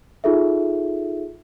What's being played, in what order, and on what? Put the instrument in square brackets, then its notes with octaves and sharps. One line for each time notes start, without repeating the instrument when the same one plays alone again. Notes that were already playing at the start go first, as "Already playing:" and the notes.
[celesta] D#4 F4 G#4 A4 E5